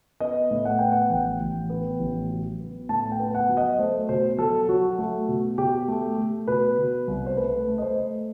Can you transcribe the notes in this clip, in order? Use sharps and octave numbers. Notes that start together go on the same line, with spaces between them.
B3 D#5
A2
F#5
B3 G5
F#5
A1 G5
A1
B3
A1
F#3
B3
A2 A5
G5
B3
F#5
F#3
D#5
A3 C5
B2 C5
F#3 A4
F#3 F#4
A3
B2
B2 G4
A3
A3
B2 B4
B2
C2
C5
A3 B4
A3
D#5
C5
A3